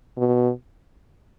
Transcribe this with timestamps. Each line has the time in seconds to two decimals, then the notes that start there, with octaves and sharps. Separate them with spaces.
0.17 B2